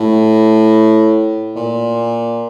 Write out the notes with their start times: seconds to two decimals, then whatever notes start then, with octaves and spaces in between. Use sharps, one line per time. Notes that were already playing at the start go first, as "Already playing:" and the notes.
Already playing: A2
1.56 A#2